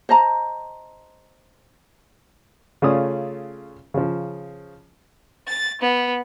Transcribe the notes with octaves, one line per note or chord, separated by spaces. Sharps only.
C5 D#5 A5 A#5
C#3 A3 C#4 F4 D5 D#6
C#3 F3
A6
B3